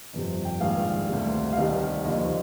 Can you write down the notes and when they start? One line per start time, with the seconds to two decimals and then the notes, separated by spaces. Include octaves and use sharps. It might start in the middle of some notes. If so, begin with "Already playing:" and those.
0.13 G1 F2 C3
0.45 G5
0.60 A#1 G#2 D#3 G3 F5
1.09 D2 C3 G3
1.53 F5
1.57 C2 C3 D#3 G3 D#5
2.05 D#2 D3 F3 D#5